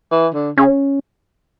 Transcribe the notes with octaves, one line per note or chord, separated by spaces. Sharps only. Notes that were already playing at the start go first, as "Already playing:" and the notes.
E3
D3
C#3 C#4